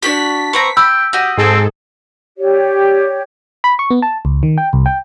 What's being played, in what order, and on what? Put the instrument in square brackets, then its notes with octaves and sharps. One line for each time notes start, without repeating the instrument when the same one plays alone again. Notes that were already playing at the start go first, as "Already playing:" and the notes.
[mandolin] D4 F#4 G4 [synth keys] B6
[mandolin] B3 C4 A#5 [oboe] C#6
[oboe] G5 [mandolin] B5 [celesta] E6
[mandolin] F#4 D#5 [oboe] G4
[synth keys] G#2 G#4 A4 [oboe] C4
[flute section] G4 C#5 D5
[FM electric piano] B5
C#6
B3
A5
C#2
D#3
G5
C2
G5